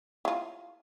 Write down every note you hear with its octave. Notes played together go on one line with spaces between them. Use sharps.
E4 F4